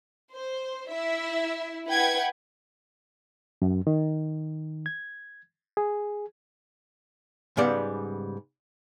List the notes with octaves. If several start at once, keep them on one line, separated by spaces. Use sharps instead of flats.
C5
E4 E5
E4 B4 F#5 G5 G#6
F#2
D#3
G#6
G#4
G#2 C#3 G3 B3 D5